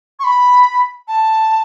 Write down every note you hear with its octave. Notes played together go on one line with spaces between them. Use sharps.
C#6
B5
A5